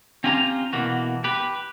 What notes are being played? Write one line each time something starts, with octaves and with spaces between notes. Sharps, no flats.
C4 C#4 F4 G4 G#5 A#5
B2 E3 A#3 F#4
G4 B4